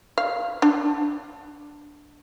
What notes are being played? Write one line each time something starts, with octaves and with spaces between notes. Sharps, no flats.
F5
D4